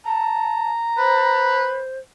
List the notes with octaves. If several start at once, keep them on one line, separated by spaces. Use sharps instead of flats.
A5 A#5
B4 C5